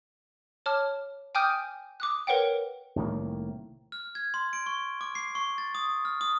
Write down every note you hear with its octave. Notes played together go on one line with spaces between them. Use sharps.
C#5 A5 D6 F6
G5 G#5 D6 D#6 F6 G6
G#5
D6 D#6 F#6
A#4 B4 C#5 F#5 G5
C2 A2 D#3 A#3
F6
G#6
C6
D7
C#6
D6
C7
C#6
A6
D#6
F6
D#6